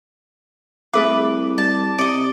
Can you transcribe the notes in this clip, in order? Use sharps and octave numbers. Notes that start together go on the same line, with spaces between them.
C2 A3 G#4 B4 E5 D6
G3 A5
C3 D5 D#5 C#7